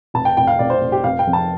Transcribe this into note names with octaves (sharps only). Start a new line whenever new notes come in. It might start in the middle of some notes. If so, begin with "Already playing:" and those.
F1 A5
G5
F1 G5
F5
F1 D5
C5
F1
G4
F1 F5
G5
F2
A5